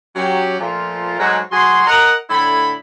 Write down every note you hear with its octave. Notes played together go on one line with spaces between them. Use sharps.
F#3 C#4 G4
A#2 F3 A3 F4
G#2 F#3 G#3 A3 F#4
F#3 F#4 G#4 C6
A#4 D#5 F#5
A2 D3 E4 B5